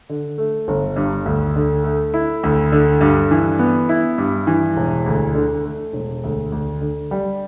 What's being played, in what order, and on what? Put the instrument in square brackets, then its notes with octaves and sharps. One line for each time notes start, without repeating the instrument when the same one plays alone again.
[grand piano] D3
A3
G1
G2
D2
D3
A3
E4
D2
D3
G2
E3
B3
E4
G2
E3
E1
D2
D3
A3
E1
D2
D2
D3
G3